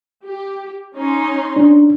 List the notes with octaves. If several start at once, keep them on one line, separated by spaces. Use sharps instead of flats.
G4
C#4 D#4 C6
D4